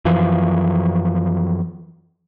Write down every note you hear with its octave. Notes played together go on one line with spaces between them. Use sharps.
F#2 E3 F3